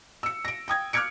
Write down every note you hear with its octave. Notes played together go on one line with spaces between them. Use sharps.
E6 C#7
A#6 D7
G5 D#6 G#6
D6 F6 F#6 G#6 C#7 D7